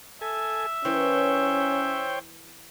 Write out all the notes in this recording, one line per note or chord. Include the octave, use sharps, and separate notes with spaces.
A4 E5 G#5
E3 C#4 A#4 C5 C#5 G5